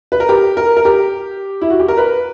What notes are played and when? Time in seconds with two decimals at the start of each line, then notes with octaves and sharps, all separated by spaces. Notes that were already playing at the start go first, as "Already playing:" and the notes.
0.12 B4
0.20 A#4
0.29 G4
0.57 A#4
0.77 A#4
0.85 G4
1.61 E4
1.70 F#4
1.80 G4
1.88 A#4
1.97 B4